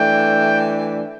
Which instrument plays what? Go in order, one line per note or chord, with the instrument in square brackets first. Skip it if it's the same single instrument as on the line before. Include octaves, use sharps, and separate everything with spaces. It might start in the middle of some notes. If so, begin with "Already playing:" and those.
Already playing: [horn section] E3 A3 D4 G5